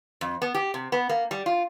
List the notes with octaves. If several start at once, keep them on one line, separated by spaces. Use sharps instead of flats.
F2
B3
G4
C3
B3
A#3
G3
F4